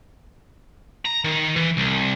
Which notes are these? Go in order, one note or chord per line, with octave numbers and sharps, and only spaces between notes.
A#5
D#3
E3
C2